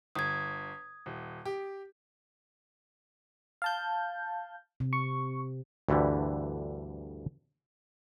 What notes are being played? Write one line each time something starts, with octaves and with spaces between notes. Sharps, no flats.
G1 D#6 G#6
D#1
G4
F5 A5 G6
C3
C#6
D2 G2 D3 E3 G3